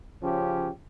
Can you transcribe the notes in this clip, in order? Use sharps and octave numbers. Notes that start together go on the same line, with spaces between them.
C#3 F3 C#4 G4